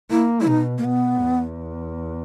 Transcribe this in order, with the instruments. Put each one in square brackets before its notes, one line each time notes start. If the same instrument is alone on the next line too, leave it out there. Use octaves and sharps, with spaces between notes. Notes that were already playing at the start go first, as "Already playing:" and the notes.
[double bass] A#3 [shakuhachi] E4
[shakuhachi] E4
[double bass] B2 [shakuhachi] D#4
[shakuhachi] A#3
[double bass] B2 [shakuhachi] B3
[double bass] E2